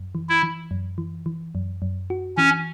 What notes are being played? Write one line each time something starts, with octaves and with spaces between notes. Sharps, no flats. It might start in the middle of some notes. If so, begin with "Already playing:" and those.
Already playing: F#2
E3
E4
E3
F#2
E3
E3
F#2
F#2
F#4
E3 C#4